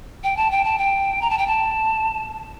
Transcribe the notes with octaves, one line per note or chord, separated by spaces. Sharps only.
G5
A5
G5
A5
G5
A#5
A5
G5
A5